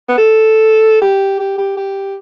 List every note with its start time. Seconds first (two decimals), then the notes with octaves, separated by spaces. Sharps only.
0.08 B3
0.18 A4
1.01 G4
1.40 G4
1.58 G4
1.77 G4